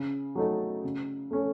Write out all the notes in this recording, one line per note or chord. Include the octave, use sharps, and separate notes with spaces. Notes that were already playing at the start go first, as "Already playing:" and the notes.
Already playing: C#3
F#3 A3 D#4 A4
C#3
A3 C#4 A4